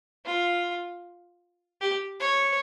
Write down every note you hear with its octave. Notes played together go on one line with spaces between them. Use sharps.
F4
G4
C#5